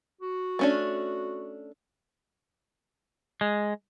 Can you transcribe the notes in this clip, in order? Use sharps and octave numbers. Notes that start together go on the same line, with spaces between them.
F#4
A3 C#4 D4
G#3